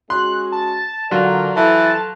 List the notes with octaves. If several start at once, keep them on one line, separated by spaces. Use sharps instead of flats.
G#3 C#4 F#4 C6 F#6
A5
D3 F#3 F4 A#4 D5
E3 F3 A4 A5